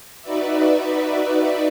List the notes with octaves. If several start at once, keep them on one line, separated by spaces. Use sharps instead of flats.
D#4 F#4 B4 D5 E5